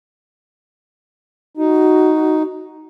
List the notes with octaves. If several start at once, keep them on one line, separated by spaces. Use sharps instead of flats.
D#4 F#4